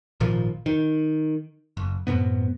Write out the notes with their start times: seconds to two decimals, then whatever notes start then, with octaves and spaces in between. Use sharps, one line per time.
0.20 G#1 A#2 D#3 F3
0.66 D#3
1.77 F#1
2.07 F#2 A2 C3 B3